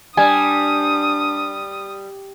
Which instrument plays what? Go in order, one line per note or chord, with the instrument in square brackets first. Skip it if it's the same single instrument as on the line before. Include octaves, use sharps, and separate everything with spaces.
[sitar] G3 [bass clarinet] D4 [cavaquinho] G#5 [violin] D#6